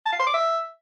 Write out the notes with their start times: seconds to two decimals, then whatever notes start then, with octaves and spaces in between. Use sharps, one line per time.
0.06 A5
0.13 F5
0.20 C6
0.27 D6
0.34 E5